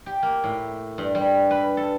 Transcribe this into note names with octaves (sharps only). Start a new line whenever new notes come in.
G4
A#3
A2
G2
G3
B4
A4